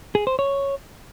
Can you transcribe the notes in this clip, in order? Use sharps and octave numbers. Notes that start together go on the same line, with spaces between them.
G#4
C5
C#5